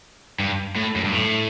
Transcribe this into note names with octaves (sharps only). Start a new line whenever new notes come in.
G2
A2
F#2
G2
A2